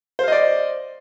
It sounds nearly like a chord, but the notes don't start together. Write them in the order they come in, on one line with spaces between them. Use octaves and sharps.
C5 F5 D#5 D5